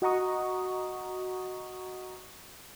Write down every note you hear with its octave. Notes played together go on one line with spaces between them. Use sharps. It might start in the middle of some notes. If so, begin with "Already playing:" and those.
F#4 D#5 F#5 A#5 C#6 D#6